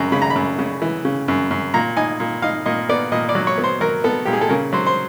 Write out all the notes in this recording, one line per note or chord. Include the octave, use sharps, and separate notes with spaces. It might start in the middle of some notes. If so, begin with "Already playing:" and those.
Already playing: F#2 C#3 A#5
C#3 B5
A#5
B5
F#2
C#3
E3
C#3
F#2
F#2
A#2 A#5
D#4 G#5
A#2
D#4 F5
A#2 D#5
B3 D5
A#2 D#5
D5
F#3
C#5
B3
C5
F#3 A#4
B3 A4
A#2 G4
G#4
A4
C#3 A#4
F#3 C5
C5